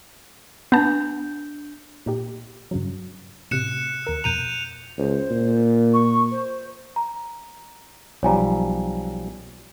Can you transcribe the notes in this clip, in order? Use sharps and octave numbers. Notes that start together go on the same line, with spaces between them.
B3 D4 A5 G6
A#2 D#4 G4
G2 C#3 F#3
A2 C3 F#6 C#7 E7
D#2 A#4 E6
F2 B2 A#5 G6 D#7 F7
C#2 C5
A#2
C#6
C5
A#5
B1 F3 G3 C#5 G#5 A#5